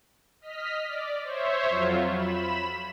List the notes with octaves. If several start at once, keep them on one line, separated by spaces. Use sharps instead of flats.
D#5 F6 B6
D5
C5 C#5 E5
F2 F#3 F4
B5 E7